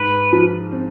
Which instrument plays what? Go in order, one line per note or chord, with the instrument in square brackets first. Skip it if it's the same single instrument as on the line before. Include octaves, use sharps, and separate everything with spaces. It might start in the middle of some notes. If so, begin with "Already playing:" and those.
Already playing: [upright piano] G#2 [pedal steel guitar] B4
[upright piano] F3
C4